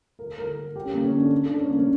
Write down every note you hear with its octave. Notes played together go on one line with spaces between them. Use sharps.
A#4
A#4
G4
C#4
A#3
C#4
D4
D4
C#4
A#3
C#4